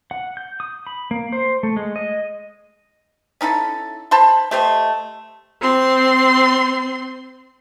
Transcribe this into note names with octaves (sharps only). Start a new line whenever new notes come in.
F#5
G6
D#6
B5
A#3
C5
A3
G#3
D#5
C#4 D#4 E4 A4
C5 A5 B5 C6
A3 G4 C5 D#5
C4 C6